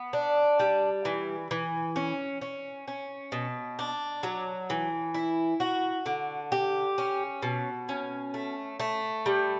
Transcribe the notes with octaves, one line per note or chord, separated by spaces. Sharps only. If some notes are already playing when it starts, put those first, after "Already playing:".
Already playing: B3
D4
G3
E3
E3
C#4
C#4
C#4
B2
D4
F#3
E3
E4
F#4
D3
G4
C#4
B2
C#4
A3
A3
G3